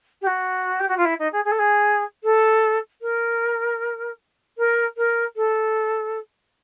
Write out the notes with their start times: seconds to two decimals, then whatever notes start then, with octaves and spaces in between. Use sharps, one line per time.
0.21 G4
0.27 F#4
0.80 G4
0.88 F#4
0.97 F4
1.05 E4
1.19 D#4
1.32 G#4
1.45 G#4
1.51 A4
1.59 G#4
2.24 A4
3.01 A#4
4.58 A#4
4.97 A#4
5.36 A4